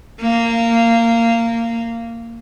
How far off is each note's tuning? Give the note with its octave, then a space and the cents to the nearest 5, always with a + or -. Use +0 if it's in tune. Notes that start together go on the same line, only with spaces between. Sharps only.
A#3 -15